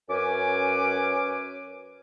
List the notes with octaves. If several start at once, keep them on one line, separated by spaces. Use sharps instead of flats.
F#2 C#4 B4 G#5 D6